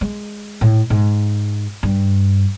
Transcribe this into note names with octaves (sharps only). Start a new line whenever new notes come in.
G#3
A2
G#2
G2